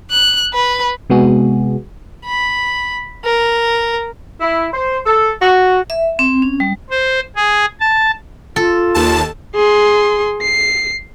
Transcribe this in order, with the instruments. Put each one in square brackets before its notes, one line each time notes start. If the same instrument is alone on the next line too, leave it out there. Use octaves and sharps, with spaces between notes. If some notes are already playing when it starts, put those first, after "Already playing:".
[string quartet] F#6
B4
[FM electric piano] C3 G#3 B3 F#4 G#4
[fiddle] B5
A#4
[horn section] E4
C5
A4
F#4
[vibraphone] E5
C4
C#4
G3
[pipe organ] C5
G#4
A5
[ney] F4 [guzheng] A4
[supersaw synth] D#2 A5
[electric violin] G#4 C6
C7